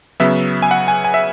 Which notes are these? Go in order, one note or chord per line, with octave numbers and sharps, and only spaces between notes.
C#3 F#3 B3 E5
G#5
F#5
G#5
G#5
E5